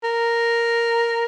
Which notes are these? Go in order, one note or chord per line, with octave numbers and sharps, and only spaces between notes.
A#4